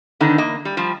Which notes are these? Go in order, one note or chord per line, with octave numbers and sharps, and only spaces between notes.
D3 D#3 B3 D#4
E2 A#3 D#5
G3
F3 G3